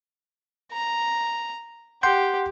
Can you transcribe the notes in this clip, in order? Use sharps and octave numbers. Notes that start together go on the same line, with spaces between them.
A#5
G4 F#5 C6 G6